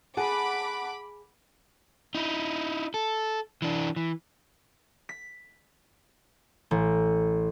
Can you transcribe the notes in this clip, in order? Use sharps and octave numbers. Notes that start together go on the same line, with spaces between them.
G#4 F#5 A5 B5 D6
D#4 E4
A4
E3 D4
E3
B6
A1